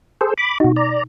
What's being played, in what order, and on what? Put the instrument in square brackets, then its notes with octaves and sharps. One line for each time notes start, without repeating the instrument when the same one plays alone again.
[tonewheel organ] G#4 A4 C5
B5 D6
[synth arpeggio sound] B2 D#4 [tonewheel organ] F#4
[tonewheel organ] D5 A#5